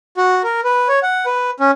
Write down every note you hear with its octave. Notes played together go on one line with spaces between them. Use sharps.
F#4
A#4
B4
C#5
F#5
B4
C#4